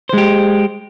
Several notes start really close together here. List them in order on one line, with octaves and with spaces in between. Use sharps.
C5 G#3 G4